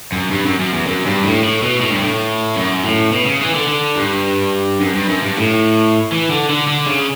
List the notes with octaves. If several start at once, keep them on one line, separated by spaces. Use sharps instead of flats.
F#2
G2
F#2
F#2
E2
F#2
G2
A2
A2
B2
A2
G2
A2
F#2
A2
B2
C#3
E3
D3
D3
G2
F#2
G2
F#2
G2
A2
E3
D3
D3
D3
C#3